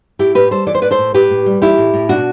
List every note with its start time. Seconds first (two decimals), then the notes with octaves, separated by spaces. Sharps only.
0.19 A2 E4 G4
0.35 A2 G4 B4
0.51 G3 A4 C5
0.67 E3 D5
0.74 C5
0.82 A2 B4 D5
0.91 A4 C5
0.98 A2
1.14 A2 G4 B4
1.30 A2
1.46 G3
1.62 E3 E4 G4
1.78 A2
1.93 A2
2.09 B2 D4 F#4